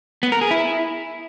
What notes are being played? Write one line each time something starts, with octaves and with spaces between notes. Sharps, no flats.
B3
A#4
G#4
E4